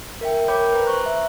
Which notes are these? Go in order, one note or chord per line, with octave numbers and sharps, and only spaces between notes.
A#4 E5 G5
A#4 C#5 G5 B5 D6 G6
B4 A#5
C5 A#5 C#6 F#6
E5